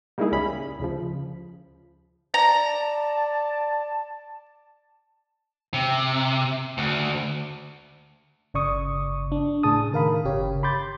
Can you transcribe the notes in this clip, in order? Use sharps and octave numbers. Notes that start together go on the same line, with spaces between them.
G3 G#3 A#3 D#4 E4 G#4
C#2 G3 C#4 B5
D2 C#3 F3
D5 A5 A#5
C3
D2
G1 C#3 D5 C#6 D#6
D4
A2 C#3 G#4 A5 D#6
D#3 A#4 F5 B5
G1 C#3 G4 C#5
B5 C6 D6 G6 A6